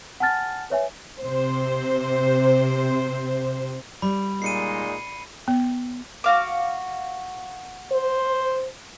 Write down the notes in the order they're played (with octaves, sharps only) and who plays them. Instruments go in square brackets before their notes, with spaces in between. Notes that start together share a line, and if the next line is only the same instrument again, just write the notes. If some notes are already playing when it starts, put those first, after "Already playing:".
[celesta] F#5 G#5 A5 F6 A6
B4 C#5 E5 G#5
[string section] C3 C5
[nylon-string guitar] G3 [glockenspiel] B5
[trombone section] A#2 G#3 D#4 [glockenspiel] C7 C#7 D#7
[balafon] B3
[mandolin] F#4 F5 D6
[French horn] C5